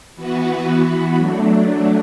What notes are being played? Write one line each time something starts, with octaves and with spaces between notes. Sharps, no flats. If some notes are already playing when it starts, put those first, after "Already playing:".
E3 B3 F#4 B4
F#3 A3 D4